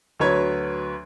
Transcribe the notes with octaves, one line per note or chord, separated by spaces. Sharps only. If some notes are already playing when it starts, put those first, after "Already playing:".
D2 F#3 B4 C#5 G#6